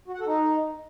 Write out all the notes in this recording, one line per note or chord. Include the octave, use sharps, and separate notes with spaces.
F#4
F#5
A4
D#4